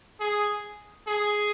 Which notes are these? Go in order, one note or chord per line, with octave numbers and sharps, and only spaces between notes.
G#4
G#4